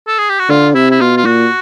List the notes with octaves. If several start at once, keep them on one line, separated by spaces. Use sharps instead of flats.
A4
G#4
G4
F#4
D3 F4
C3 E4
E4
B2 F4
F4
A#2 F#4